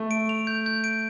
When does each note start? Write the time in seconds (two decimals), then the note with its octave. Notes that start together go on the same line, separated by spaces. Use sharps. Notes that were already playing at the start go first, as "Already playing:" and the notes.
Already playing: A3
0.11 D7
0.29 F7
0.47 G6
0.66 G6
0.84 D7